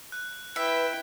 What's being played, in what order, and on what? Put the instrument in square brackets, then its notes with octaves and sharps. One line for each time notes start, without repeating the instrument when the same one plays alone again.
[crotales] F#6
[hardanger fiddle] E4 G5 [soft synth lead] B4 [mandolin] E5